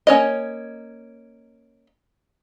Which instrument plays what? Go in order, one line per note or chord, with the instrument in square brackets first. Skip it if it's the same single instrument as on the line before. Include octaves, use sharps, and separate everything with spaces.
[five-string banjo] A#3 C#4 C#5 D#5